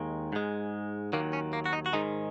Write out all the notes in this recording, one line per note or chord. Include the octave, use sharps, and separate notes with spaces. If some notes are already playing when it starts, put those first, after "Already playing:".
Already playing: D#2 D#3 G#3
G#2 G#3
D#2 D#3 F#3 A#3
C#4
A#3
F#4
D#4
F#4
G#2 D#3 G#3 D#4